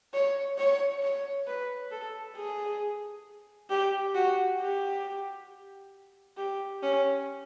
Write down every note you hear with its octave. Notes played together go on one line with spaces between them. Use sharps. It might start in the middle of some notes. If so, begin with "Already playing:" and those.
C#5
C#5
C#5
B4
A4
G#4
G4
F#4
G4
G4
C#4